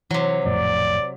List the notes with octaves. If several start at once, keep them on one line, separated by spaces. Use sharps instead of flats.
C3 E3 F#3
A#1 F2 A2 D5